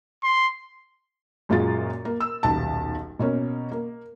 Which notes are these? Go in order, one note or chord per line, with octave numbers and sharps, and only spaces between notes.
C6
F#2 A#2 G#3 F4 F#4 A6
A#3
E6
D#1 B1 A5
B2 A#3 C#4
A#3